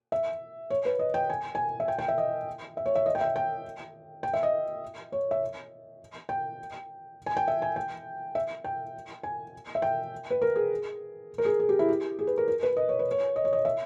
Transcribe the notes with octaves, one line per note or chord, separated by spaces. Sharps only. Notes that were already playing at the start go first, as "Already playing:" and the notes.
E5
C#5
B4
D#5
G5
G#5
G#5
E5
G5
G5
E5
D#5
E5
C#5
E5
D#5
G5
E5
G5
G5
E5
D#5
C#5
E5
G5
G#5
G5
E5
G#5
G5
E5
G5
G#5
E5
G5
B4
A#4
G#4
A#4
G#4
G#4
G4
E4
G4
G#4
B4
A#4
A#4
B4
D#5
C#5
B4
C#5
D#5
C#5
D#5
E5